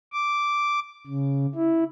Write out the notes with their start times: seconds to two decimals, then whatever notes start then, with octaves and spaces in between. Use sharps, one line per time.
0.12 D6
1.06 C#3
1.55 E4